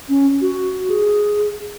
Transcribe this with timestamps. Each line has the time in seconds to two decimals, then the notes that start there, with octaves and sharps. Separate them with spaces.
0.09 C#4
0.41 F#4
0.90 G#4